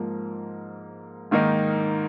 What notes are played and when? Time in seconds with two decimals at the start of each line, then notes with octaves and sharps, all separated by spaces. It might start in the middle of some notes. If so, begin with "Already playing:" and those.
Already playing: G#2 F3 A#3
1.31 G#2 D#3 A#3 D#4